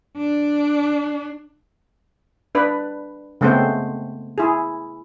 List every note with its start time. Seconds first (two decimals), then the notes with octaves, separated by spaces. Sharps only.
0.17 D4
2.55 D4 B4
3.41 C#3 G#3 A3 B3 C4 C5
4.38 E4 G#4